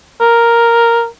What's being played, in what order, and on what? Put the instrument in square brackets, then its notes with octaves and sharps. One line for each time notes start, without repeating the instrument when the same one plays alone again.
[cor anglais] A#4